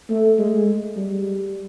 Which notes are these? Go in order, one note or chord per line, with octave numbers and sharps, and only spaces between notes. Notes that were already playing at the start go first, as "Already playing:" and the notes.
A3
G#3
G3